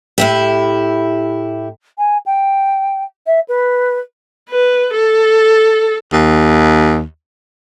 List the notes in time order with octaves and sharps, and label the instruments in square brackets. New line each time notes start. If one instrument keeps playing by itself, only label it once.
[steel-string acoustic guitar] A2 E4 G4
[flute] G#5
G5
E5
B4
[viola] B4
A4
[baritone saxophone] D#2